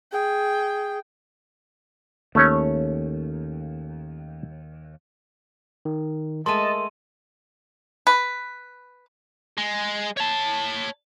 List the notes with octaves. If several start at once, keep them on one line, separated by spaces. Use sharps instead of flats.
G#4 G5
D#2 A3 C#4 C#5
D#3
G#3 A3 A#4 D#5 A5 C6 D#7
B4
G#3
C#5 A5